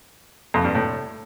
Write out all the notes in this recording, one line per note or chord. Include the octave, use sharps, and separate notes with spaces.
F2
G2
A2